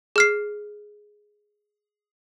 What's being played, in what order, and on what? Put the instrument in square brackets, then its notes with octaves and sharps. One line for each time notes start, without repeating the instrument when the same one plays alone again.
[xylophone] G#4 F6 C7